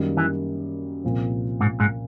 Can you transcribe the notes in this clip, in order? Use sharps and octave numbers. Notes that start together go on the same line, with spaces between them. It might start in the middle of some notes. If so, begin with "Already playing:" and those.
Already playing: F#2 D#3 G3 A#3
E3
C2 A#2 F3
G#2
G#2